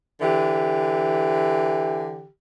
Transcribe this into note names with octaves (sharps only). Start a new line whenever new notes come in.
D3 E3 G4